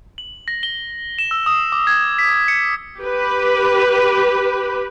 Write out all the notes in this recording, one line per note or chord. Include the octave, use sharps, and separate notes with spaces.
F#7
A#6
G7
E7
E6
D#6
D6
G#6
B6
C#7
G4 B4